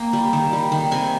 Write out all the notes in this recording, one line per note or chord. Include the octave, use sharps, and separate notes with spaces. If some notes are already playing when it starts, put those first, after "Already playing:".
Already playing: A#3 G5
G3
D#3
G3
D#3
C3 G#5